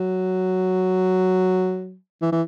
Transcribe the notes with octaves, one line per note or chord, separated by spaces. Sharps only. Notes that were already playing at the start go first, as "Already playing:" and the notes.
Already playing: F#3
E3
E3